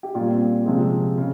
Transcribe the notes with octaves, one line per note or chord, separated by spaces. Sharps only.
G4
A#2 G3 F4
C4
C3 F3 G#3 C4
C#3